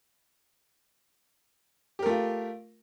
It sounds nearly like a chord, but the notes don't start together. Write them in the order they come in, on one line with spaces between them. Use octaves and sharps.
G4 A#4 A3 F4